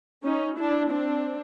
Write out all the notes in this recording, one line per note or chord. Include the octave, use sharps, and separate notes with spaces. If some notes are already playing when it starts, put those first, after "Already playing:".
C#4 D#4
D4 E4
C4 D4